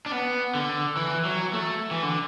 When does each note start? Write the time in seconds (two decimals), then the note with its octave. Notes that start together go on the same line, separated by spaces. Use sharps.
0.06 D4
0.12 B3
0.55 D3
0.97 E3
1.25 F#3
1.53 A3
1.91 E3
2.03 D3